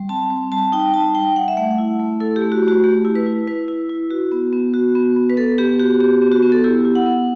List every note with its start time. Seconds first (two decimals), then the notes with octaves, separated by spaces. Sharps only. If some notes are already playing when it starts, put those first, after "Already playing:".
Already playing: G3
0.09 C4 A5
0.30 C4
0.52 G3 A5
0.72 D#4 G5
0.94 D#4 A5
1.15 G3 G5
1.36 G3 F#5
1.48 E5
1.57 A3 F#5
1.78 E4
1.99 A3
2.20 E4 A4
2.36 G4
2.42 A3
2.52 F#4
2.63 A3
2.68 F#4
2.84 A3 G4
3.05 E4
3.15 B4
3.26 E4
3.47 E4 B4
3.68 E4
3.90 E4
4.11 F#4
4.32 B3
4.53 B3
4.74 F#4
4.95 B3
5.16 B3
5.30 B4
5.37 B3 A4
5.58 B3 G4
5.79 F#4 G4
6.00 B3 G4
6.22 B3
6.32 F#4
6.43 B3
6.52 A4
6.64 E4 G4
6.85 E4
6.95 F#5
7.06 B3